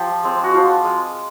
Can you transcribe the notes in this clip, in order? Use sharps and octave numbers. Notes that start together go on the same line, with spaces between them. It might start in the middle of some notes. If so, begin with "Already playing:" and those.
Already playing: F3 G4
G#3 C4
F#4
F3 F4
G#3